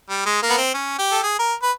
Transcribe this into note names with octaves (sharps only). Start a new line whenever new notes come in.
G3
G#3
A#3
B3
C4
C#4
G4
A4
G#4
A#4
B4